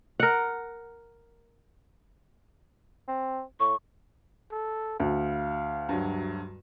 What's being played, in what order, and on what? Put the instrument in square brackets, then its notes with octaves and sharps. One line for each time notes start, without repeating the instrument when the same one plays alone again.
[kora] A#4 F#5
[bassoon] C4
[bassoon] A2 [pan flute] C#6
[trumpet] A4
[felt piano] D2 [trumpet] F5
[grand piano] G2 F#3